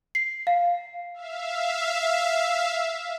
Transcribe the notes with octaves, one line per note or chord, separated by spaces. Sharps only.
C7
F5
E5 F5